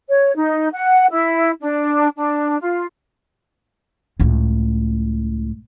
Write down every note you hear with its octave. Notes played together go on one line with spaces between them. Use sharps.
C#5
D#4
F#5
E4
D4
D4
F4
C#2 A2